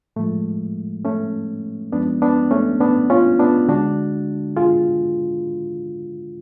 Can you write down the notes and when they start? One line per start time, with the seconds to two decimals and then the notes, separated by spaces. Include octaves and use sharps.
0.16 A2 F3 G#3 A3
1.05 A3 C#4
1.92 F#2 F3 G#3 B3 D4
2.22 B3 D4
2.51 A3 C#4
2.81 B3 D4
3.10 C#4 F4
3.39 B3 D4
3.68 D2 D3 G#3 D4 F#4
4.56 F4 G#4